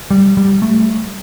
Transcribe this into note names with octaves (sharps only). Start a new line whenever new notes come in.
G3
G3
A3